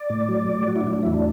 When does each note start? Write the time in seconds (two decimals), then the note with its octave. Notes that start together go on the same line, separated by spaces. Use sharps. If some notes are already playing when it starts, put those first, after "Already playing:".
Already playing: D5
0.10 A2
0.29 F#3
0.49 A2
0.67 F#3 F#4
0.76 E4
0.81 D4
0.87 A2
0.93 D4
1.03 E2 E4
1.14 D4